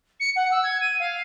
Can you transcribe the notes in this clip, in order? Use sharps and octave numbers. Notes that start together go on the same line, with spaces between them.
C#7
F#5
E6
G#6
D#7
F5